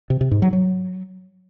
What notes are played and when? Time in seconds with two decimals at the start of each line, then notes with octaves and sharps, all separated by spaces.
0.10 C3
0.21 C3
0.31 G#2
0.42 F#3
0.53 F#3